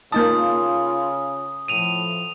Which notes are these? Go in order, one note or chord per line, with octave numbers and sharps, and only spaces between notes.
C#3 A#3 D#4 F4 A5 D#6
A2 F3 D#7 F7